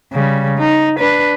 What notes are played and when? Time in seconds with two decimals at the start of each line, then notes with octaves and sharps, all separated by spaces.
0.13 C#3 G3
0.58 D#4
0.99 D4 B4